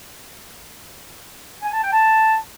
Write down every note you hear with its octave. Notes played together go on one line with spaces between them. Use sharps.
G#5
A5
G5
A5